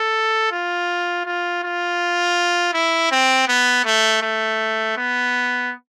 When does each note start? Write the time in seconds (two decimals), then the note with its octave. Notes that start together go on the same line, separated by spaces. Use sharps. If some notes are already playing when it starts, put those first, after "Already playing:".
Already playing: A4
0.52 F4
1.25 F4
1.63 F4
2.73 E4
3.11 C4
3.48 B3
3.85 A3
4.22 A3
4.97 B3